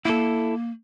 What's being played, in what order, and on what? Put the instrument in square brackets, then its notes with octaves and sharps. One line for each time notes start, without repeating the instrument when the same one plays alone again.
[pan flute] A#3 [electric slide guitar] E4 A4